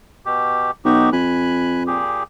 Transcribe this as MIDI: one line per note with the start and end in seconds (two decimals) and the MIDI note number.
0.25 0.71 47
0.25 0.71 67
0.85 1.09 35
0.85 1.10 63
0.85 1.10 66
0.85 1.10 67
1.13 2.01 41
1.13 1.83 80
1.13 1.83 83
1.13 1.83 90
1.87 2.23 46
1.87 2.23 67
1.87 2.23 68